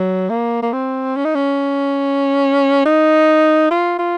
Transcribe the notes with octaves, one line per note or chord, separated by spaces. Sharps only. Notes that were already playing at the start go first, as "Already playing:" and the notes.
Already playing: F#3
A#3
A#3
C4
C#4
D#4
C#4
D#4
F4
F4